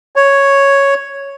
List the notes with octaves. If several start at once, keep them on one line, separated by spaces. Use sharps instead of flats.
C#5